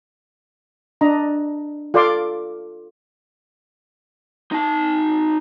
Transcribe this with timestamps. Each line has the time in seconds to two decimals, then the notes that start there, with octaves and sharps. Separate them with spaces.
1.01 D4 D#5 A#5
1.94 F4 A4 D5 F5 C6 D6
4.52 D#4 A5